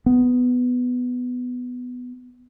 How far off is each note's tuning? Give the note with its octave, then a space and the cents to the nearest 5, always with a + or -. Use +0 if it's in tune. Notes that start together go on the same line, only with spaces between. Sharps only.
B3 +10